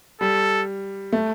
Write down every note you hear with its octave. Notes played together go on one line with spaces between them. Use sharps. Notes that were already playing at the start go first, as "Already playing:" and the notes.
G3 A4
A3